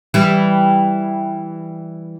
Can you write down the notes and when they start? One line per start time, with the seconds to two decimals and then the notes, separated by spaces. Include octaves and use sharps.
0.14 E3 G3